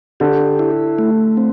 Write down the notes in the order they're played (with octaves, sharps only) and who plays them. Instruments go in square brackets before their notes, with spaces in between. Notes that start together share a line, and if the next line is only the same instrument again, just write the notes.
[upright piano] D3 [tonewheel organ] G4
[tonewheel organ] E4
A3
C4